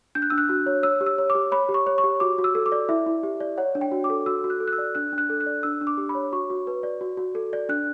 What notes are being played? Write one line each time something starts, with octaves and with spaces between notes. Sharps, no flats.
D4 G6
F#6
D4 E6
F#6
F#4
C#5
C#5 E6
G4
E6
C#5
D6
G4
C#5 B5
G4
C#6
C#5
C#6
G4
F#4 D6
F#4
E6
A4
D6
D5
E4 E5
E4
G4
D5
C#5 F#5
D4
G5
F#4
D6
A4
F#4 E6
F#4
F#6
A4
F#6
E6
D5
D4 F#6
D4
F#6
A4
F#6
D5
D4 E6
D4
D6
G4
B5
C#5
F#4 C#6
F#4
B4
D5
F#4
F#4
A4
D5
D4 F#6